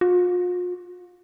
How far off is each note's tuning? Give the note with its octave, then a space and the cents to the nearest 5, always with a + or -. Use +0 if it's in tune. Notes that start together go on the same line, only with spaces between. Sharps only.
F4 +40